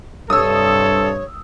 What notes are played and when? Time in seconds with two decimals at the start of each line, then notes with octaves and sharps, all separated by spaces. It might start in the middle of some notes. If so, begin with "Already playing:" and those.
0.30 G2 C3 A4 C#5 D#6 E6